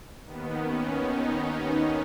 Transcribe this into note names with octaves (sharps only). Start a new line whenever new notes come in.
D#2 D#3 B3
C#4
D#4